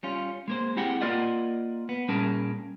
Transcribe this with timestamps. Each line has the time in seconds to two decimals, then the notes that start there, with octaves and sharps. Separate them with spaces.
0.03 G3 C#4 F4
0.48 G#3 A#3 C5
0.77 C4 E4 G4 G#4 F#5 G5
1.01 A#3 F4 A#4 D5 D#5 F#5
1.89 B3
2.08 A#2 G3 C#4 G#4 A#4 A5